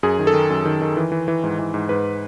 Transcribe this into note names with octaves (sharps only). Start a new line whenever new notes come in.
F#2 G#4
D#3
A4
D#3
F#2
D#3
D#3
E3
E3
E3
G#2
E3
G#2
G#2 B4